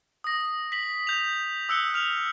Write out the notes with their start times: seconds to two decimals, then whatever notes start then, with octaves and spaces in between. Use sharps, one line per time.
0.24 D#6 A#6
0.72 B6 F#7
1.07 G6 F7
1.69 D#6 E6 F#6 C#7 F7 G7
1.94 F6 F7